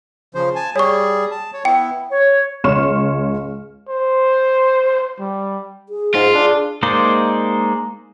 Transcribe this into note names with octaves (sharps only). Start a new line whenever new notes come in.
C#3 F3 C5
G#5 A5
G3 G#4 C#5 C#6
A5
C#5
B3 E4 G5
C#5
C#2 C#5 C6 C#6 F6 E7
C5
G3
G#4
G#2 F4
D4
G#3 A#3 D#4 C5 D5